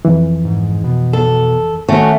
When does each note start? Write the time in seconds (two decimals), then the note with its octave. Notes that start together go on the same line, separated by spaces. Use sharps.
0.05 F2 E3
0.45 G#2
0.84 B2
1.13 A4
1.88 D#3 A3 C#4 F#4